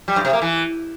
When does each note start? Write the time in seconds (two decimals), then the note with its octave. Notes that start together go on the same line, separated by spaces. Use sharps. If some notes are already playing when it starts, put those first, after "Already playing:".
0.08 G3
0.16 G2
0.25 C3
0.33 A#3
0.42 E3